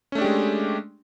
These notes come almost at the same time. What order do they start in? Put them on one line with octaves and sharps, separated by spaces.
C#4 A3 D4 G4 G#3